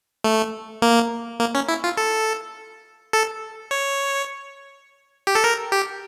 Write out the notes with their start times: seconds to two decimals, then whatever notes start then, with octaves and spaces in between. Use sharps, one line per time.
0.24 A3
0.82 A#3
1.40 A#3
1.55 C#4
1.68 E4
1.84 F4
1.97 A4
3.13 A4
3.71 C#5
5.27 G4
5.35 A4
5.44 A#4
5.72 G4